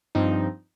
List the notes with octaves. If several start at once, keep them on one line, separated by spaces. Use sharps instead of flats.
G2 F3 C4 D#4